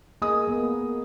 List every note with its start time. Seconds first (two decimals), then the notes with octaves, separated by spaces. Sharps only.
0.22 A#3 G#4 D#5 D#6
0.48 A#3 B3